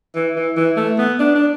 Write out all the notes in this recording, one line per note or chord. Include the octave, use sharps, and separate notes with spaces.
E3
E3
E3
A3
B3
D4
D4